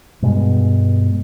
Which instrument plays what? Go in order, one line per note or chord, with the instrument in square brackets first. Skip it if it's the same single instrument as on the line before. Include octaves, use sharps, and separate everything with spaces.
[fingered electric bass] G2 B2 G#3